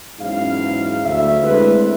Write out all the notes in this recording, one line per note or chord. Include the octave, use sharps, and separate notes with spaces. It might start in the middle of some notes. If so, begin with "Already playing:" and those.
E2 G#2 F#3 C#4 E4 F5
D2 E5
G#3 A3 C4 D4 E4 B4